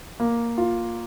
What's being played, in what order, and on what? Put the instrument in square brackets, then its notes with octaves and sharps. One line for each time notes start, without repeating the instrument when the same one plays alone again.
[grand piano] A#3
F4